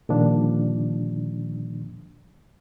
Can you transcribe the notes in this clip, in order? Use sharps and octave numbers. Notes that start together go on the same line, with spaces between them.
A#2 D3 D#3 F3 G3 D4